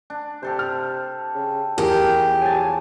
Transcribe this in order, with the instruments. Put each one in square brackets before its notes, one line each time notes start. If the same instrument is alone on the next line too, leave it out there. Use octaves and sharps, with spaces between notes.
[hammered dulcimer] D4
[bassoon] C3 [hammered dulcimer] G4 A4 C5
[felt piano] F6
[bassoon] C#3
[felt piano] E2 [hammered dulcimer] F3 F5 [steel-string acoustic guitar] G4 [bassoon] A#4
[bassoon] F#3 [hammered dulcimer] G#5 A5